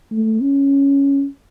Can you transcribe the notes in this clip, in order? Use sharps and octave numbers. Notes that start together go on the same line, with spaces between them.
A3
C#4